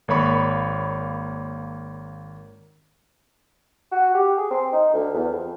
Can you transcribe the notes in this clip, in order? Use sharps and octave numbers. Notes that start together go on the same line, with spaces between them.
G#1 A#3 C#5 B5 C#6
F#4
G4
G#4
C4
D#4
D2
E2
F2